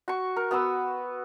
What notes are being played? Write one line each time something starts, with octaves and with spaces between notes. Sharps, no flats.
F#4 C#6
A#4
B3 F#4 B4 E6